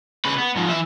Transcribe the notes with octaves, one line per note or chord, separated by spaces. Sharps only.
C#3 B4
B3
G#2 F3
E3 E5